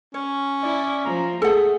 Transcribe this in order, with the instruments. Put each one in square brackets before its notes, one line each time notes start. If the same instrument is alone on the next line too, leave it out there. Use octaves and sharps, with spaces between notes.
[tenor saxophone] C#4 [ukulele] C#5
[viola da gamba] E4 [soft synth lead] D5
[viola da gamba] F3 [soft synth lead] A#5
[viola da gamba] A3 [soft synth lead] G#4 [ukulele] A4 F#5